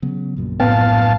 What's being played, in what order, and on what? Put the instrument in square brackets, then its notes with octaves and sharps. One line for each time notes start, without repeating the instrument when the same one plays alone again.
[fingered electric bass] C#3 F#3 B3
A#1 F#2 A#2
[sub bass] A2 [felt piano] B3 G5 [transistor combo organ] F5 A5